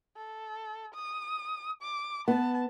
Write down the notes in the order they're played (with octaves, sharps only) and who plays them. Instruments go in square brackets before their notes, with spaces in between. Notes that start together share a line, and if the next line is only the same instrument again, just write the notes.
[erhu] A4
D#6
D6
[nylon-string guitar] B3 [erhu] A5